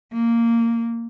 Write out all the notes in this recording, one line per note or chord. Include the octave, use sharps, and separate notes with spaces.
A#3